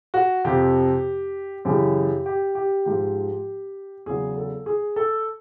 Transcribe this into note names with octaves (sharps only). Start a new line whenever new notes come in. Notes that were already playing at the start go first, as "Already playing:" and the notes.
F#4
F2 C3 F3 G4
F#2 C#3 E3 G4
G4
G4
G#2 F3 G4
E2 C#3 F#3 G#4
A4
G#4
A4